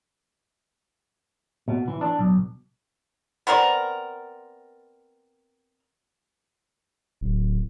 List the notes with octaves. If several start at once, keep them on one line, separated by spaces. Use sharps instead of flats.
B2
E3
D4
B1
B3 C4 A#4 D5
D1